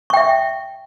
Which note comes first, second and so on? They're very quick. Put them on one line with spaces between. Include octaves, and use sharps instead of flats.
C#6 G5 E5